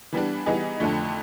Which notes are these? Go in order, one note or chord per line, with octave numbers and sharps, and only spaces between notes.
E3 G3 B3 D4
E3 G3 B3 D#4 G#4
F2 D3 F3 A3 D4